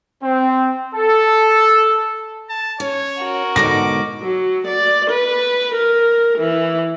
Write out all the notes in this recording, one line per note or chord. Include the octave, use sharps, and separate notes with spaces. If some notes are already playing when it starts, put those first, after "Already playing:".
C4
A4
A5
C#4 C#5
F#4 A#4
G#2 B2 D3 D6 A#6
F#3
D5
B4
A#4
E3